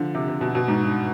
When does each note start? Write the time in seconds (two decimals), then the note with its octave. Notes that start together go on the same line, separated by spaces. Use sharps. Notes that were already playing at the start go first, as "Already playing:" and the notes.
Already playing: D3 F3
0.14 C3
0.28 C3
0.41 B2
0.55 B2
0.68 G#2
0.82 G2